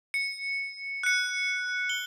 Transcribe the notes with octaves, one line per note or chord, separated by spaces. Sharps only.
C#7
F#6 C#7
G7